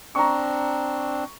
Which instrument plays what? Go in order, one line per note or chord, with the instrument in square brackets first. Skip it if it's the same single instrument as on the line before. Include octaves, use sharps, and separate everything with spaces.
[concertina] C4 D4 [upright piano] A#5 C#6